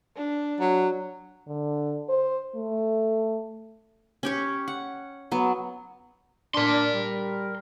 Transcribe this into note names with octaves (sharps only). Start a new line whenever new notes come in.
D4
F#3
D3
C5
A3
C#4 G4 C#5
F#5
F#3 B3
D4 A#4 C6
G3